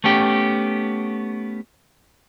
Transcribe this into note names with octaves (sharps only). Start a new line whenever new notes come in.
A3 B3 C#4 G4